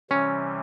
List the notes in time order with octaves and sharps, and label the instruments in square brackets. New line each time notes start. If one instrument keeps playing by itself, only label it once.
[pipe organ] C3 E3 G3 [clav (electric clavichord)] C#4